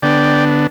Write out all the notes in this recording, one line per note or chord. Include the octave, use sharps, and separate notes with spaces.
D3 B3 D4 D5 G5